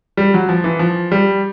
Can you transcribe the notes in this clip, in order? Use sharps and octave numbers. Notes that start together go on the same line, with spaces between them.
G3
F#3
F3
E3
F3
G3